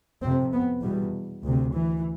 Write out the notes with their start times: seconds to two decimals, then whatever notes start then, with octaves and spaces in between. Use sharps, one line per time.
0.23 F2 C3 C4
0.53 B3
0.83 E2 B2 G3
1.44 D2 C3
1.74 E3